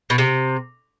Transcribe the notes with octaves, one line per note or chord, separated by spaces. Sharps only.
B2
C3